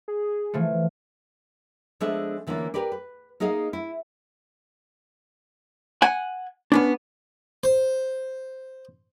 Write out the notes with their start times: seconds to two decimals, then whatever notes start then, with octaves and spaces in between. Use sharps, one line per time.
0.08 G#4
0.54 E3 F3 A3
2.00 F3 G#3 B3 D4 A4 E5
2.47 D3 E3 A#3 C#4 F4
2.74 G4 A#4 B4 D5
2.92 B4
3.40 A#3 D#4 G#4 D#5 F5
3.73 E4
6.02 F#5 G#5
6.72 B3 C#4 D4
7.64 C5